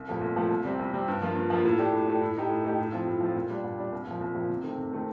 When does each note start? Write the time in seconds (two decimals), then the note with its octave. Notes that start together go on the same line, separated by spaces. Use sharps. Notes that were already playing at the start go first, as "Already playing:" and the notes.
Already playing: C2
0.08 A#2 F3 A3
0.21 C2
0.36 A#2 F3 A3
0.51 C2
0.65 C3 G3 C4
0.79 C2
0.93 C3 G3 C4
1.08 G2
1.22 F3 A#3 F4
1.36 G2
1.50 F3 A#3 F4
1.65 A2
1.79 A3 D4 G4
1.93 A2
2.07 A3 D4 G4
2.21 A2
2.36 A3 D#4 G4
2.49 A2
2.64 A3 D#4 G4
2.78 A2
2.92 F3 C4 F4
3.07 A2
3.21 F3 C4 F4
3.36 A#2
3.50 G3 D4
3.64 A#2
3.79 G3 D4
3.92 C2
4.07 A#2 F3
4.21 C2
4.35 A#2 F3
4.50 C3
4.63 D#3 A3 C4
4.78 C3
4.92 D#3 A3 C4